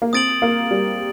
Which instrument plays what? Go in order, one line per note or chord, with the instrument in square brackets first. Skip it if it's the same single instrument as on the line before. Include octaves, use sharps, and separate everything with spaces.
[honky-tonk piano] A#3
[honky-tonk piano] C4 [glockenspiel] D#6 A6 D7 F#7
[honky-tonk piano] A#3
G3